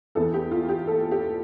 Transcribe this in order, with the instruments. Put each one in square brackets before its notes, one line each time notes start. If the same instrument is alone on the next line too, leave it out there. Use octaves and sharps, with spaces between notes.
[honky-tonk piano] E2 E3 A4
G4
F4
G4
A4
G4